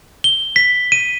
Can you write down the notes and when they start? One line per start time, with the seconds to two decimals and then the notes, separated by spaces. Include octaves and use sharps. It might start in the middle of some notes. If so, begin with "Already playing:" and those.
0.24 G7
0.56 B6
0.92 D#7